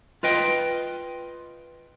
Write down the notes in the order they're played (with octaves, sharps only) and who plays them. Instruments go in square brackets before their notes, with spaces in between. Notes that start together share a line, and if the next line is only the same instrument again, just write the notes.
[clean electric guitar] F4 B4 D#5 G5